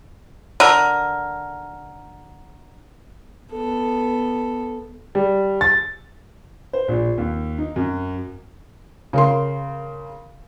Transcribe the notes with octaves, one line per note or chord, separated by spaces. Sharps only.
D3 A#4
B3 A4
G3
A6
C5
A#1
D#2
D#4
F#2
C#3 A#4 C6